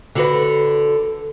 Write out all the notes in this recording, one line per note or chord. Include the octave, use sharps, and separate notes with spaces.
D3 F#4 B4